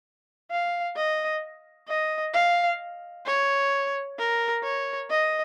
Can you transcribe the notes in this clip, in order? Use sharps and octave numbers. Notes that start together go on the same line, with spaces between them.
F5
D#5
D#5
F5
C#5
A#4
C#5
D#5